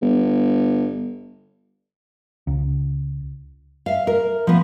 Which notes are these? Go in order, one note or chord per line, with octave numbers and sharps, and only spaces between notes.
G1
C#2
E5 F5
A#4
F3 B3